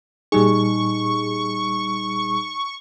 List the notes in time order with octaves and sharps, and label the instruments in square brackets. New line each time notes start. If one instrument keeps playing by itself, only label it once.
[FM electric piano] A#2 G3 G#4 [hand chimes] D#4 [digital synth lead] C#6